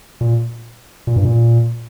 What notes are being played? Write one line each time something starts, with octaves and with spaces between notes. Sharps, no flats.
A#2
A#2
G2
A#2